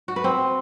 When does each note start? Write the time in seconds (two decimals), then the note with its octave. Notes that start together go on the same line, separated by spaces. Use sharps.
0.08 F#4
0.16 B4
0.24 C4